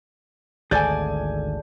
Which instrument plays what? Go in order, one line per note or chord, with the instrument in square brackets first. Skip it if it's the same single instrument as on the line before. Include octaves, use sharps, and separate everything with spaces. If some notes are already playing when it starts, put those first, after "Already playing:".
[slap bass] G#1 D2 [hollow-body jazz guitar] G#4 A4 [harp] D5 [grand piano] G#5 G6